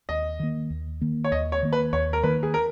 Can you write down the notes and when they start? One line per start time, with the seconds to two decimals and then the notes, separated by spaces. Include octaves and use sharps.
0.09 D#2 D#5
0.40 D#3 A#3
0.70 D#2
1.01 D#3 A#3
1.24 C#5
1.32 D#2 D#5
1.52 C#5
1.62 D#3 A#3
1.73 B4
1.93 D#2 C#5
2.13 A#4
2.23 D#3 A#3 B4
2.43 G#4
2.54 A#4